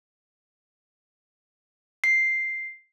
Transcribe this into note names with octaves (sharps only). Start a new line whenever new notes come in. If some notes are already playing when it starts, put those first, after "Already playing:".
C7